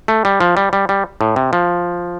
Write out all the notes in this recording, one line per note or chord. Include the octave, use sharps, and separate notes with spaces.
A3
G3
F3
G3
G3
G3
A2
C3
F3